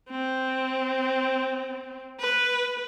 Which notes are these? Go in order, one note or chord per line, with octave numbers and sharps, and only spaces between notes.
C4
B4